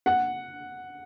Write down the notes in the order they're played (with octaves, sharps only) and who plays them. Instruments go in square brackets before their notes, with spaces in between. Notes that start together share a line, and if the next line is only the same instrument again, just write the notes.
[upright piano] F#5